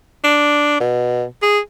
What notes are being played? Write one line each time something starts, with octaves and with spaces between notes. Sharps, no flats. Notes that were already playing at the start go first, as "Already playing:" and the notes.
D4
B2
G#4